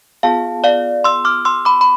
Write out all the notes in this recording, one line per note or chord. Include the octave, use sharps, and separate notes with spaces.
B3 F4 G#4 F5 A5
D5 F5
C6 E6
D6 F6
C6 E6
B5 D6
B5